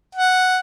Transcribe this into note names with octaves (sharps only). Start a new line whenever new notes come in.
F#5